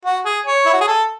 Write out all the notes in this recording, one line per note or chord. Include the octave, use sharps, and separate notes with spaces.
F#4
G#4
C#5
E4
F#4
G#4
A4